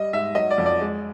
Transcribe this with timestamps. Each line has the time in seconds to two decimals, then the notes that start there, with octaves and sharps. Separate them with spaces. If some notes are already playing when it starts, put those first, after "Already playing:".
Already playing: G3 D#5
0.13 G#2 E5
0.35 F#3 D#5
0.50 D5
0.58 F2
0.66 D5
0.81 G#3